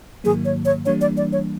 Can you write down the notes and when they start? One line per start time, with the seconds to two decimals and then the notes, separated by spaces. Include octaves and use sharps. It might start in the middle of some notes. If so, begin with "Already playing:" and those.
0.24 G#2 D#3 F#3 A#3 G#4
0.45 C#5
0.65 C#5
0.85 E3 G3 A#3 D4 C#5
1.01 D5
1.17 D5
1.32 C#5